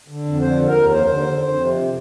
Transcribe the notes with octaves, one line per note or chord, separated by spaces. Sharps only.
D3
F2
D3 C5
D#2
A#4
D#2
F2 C5
D3
D3
F2
C3